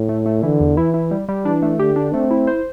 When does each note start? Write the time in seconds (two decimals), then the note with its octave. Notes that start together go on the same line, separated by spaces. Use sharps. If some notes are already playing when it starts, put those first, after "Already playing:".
Already playing: A2
0.09 A3
0.26 A3
0.43 D3 E3
0.60 E2
0.77 E3 E4
0.94 E4
1.11 G3
1.29 G3
1.45 E3 D4
1.62 A3
1.79 D3 G4
1.96 D4
2.13 A3 C4
2.31 E4
2.47 C5